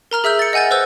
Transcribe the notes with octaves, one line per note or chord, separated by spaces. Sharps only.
A#4 A#5 F6 G7
G#4 E5 E6 F6 G6
A6 C#7
D#5 F#5 G#5 G6 A6
B4 C5 E6 G6